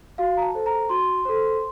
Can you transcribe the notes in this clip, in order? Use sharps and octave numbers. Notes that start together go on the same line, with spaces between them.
F#4 F5
A#5
A5
A4 C5
A#5
F#4 C6
A4 C5